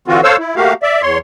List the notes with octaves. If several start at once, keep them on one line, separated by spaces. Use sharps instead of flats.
D3 E3 C4 F4 F#4
A4 C5 C#5 F5 E6
E4
A3 A#3 F#4 G4 F5
D5 E5
E2 C#5 C6